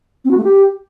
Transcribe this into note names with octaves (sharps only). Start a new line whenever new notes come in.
C4
F#4
A3
G4